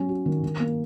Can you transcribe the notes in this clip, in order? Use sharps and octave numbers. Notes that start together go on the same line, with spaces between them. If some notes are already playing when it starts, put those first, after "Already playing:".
Already playing: F#3 C#4
F#4
D#3
D#3
A#3